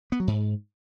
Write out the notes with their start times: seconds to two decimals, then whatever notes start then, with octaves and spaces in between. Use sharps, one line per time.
0.12 B3
0.20 F#3
0.27 G#2